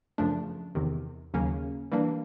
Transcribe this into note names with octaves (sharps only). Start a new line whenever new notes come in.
F#2 C#3 F3 A3 D4
E2 C3 D#3
D#2 C#3 F#3 A#3 C#4
E3 G3 A#3 D4